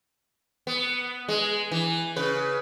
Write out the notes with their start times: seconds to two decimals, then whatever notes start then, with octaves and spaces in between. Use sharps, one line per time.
0.67 B3
1.28 G#3
1.72 E3
2.16 C#3 B4